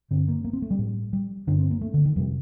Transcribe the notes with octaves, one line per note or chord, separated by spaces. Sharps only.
G2 D3 C4
A#3
A#3
C4
A3
G3
A2
G3
G2 D3 D4
C4
A#3
A3
D3
D#3
F2 C3 G3